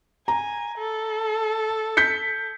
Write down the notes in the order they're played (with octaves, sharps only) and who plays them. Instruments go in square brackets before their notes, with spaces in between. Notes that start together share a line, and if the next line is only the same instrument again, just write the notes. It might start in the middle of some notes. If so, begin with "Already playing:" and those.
[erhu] G#5 [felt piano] A#5
[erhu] A4
[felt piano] G6 B6 C#7